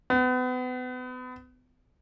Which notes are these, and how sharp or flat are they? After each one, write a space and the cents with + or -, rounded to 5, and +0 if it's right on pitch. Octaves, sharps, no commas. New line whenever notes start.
B3 +35